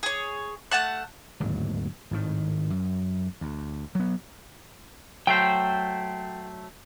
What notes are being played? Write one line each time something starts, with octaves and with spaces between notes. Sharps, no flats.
G#4 C#5
A3 F#5 A5 F#6
D1 G#1 D#2 F#3
G#1 A2 D#3
F#2
D2
F#3 B3
F#3 A3 C5 G5